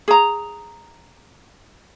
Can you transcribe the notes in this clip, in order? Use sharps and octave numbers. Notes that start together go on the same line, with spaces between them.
G#4 A#5